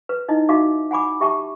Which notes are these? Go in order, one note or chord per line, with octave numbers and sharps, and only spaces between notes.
B4
D#4 E4 D#5
D#4 F#4 E5 F5 D6
F#5 G#5 B5 D6
G4 E5 G5 A5 C#6